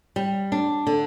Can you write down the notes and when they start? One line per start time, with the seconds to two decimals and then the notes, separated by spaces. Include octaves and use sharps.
0.16 G3
0.52 D4
0.87 D3